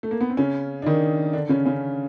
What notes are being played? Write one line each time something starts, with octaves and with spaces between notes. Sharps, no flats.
A3
A#3
B3
C4
C#3 C#4
D4
D#3 D#4
D3 D4
C#3 C#4
C#3 C#4